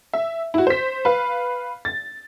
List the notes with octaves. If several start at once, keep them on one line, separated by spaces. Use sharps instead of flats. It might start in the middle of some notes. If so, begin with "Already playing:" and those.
E5
E4 F#4
C5 B6
B4 F5
A6